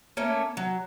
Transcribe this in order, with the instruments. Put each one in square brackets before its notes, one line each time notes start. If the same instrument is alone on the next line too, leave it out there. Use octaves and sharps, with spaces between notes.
[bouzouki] A3 A#3 C#4
F#3